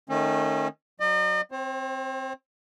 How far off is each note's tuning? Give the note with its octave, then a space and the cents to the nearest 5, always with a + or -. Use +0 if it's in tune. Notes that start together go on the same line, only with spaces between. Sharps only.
D#3 -10 A3 +5 C#4 -35
F#3 +0 D#5 -45
C4 +0 C5 +40